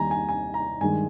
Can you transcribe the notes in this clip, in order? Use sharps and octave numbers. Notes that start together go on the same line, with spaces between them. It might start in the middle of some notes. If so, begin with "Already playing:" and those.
Already playing: D#2 D#3 G3 G#5 A#5
G#5
G#5
A#5
G2 D#3 G#3 G#5